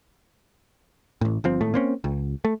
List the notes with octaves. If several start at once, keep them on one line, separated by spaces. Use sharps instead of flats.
A1 A2
G1 F3 C4
G#1 A2 A3
A#3 C4 C#4
C#2
A3